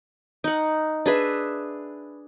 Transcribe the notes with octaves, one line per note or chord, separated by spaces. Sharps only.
D#4 F#5
D4 G#4 B4 E5